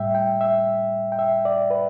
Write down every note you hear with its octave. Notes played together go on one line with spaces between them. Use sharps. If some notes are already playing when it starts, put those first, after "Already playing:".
Already playing: A2 G3 E5 G5
G5
E5
G5
E5
D5
B4